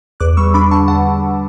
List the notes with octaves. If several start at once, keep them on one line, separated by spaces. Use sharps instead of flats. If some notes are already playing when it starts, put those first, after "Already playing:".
E2 D6 F#6
G3 C#6 E6
D4 B5 D6
D3 A5 C#6
E2 F#5 A5